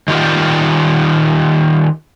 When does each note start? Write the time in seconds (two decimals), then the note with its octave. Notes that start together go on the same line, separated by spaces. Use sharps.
0.08 D#3 G3 F4 G4